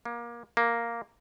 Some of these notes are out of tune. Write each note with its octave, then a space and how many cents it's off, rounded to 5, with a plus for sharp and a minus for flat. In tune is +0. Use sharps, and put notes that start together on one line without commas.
A#3 +25
A#3 +0